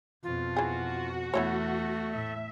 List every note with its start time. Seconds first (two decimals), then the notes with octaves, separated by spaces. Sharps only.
0.23 F2 B2 F4
0.57 E3 F#4 G#4
1.34 E2 A3 B3 E4 C#5
2.14 A2 E5